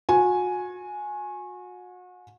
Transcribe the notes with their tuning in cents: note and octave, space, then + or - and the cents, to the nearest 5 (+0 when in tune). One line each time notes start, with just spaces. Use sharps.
F#4 -35 G#5 +5